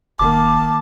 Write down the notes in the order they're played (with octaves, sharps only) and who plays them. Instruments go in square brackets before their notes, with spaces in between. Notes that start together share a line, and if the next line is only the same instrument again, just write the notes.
[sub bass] F1 [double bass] D#3 A#3 [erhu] A5 [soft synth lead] D6